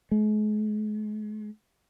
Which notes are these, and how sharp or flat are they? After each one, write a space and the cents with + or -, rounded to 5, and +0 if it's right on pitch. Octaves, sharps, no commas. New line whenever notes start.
G#3 +40